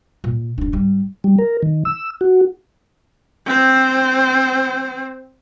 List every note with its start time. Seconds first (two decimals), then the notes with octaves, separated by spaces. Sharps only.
0.24 A#2
0.58 F1 D4
0.72 G#1 G3
1.24 G3
1.39 A#4
1.63 D#3
1.85 E6
2.21 F#4
3.47 C4 C5